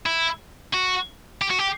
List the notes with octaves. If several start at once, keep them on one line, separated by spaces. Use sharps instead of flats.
E4
F#4
G4
F#4
G4